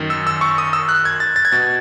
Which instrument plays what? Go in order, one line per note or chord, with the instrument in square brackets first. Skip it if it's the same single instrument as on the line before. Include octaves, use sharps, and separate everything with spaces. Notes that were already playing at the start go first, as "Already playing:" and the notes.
Already playing: [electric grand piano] F#2 D#3
E6
E6
C#6
D#6
E6
F#6
G#6
A6
A6
G#6
B2 A6